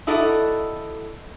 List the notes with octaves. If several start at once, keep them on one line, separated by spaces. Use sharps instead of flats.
D#4 E4 F#4 A4 D5 D#5